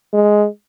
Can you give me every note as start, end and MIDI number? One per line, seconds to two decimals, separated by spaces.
0.13 0.46 56